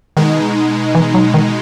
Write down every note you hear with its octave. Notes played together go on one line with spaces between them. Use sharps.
B2 D#3 G#3 D#4
E3
F#3
D#3